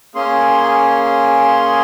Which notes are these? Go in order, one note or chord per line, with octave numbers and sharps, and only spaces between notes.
A#3 C#4 G#4 C6